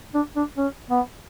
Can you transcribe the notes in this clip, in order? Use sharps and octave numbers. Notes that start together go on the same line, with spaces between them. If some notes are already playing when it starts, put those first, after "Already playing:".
D4
D4
C#4
B3